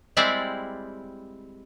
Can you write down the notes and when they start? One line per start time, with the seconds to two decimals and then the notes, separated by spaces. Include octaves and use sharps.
0.17 G3 G#3 C4 E4 D5